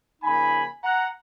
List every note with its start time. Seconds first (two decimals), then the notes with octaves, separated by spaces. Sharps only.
0.22 C#3 F3 A#3 D#4 G#5 B5
0.84 F#5 A#5